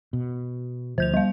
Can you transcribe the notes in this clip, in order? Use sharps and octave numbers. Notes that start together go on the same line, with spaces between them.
B2
D2 F3 C5 G6 F7
G3 F5